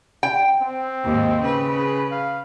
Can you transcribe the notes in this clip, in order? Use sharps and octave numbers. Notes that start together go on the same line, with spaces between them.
G5
C4
D#2 G#2
C#3 B4
G#4
F5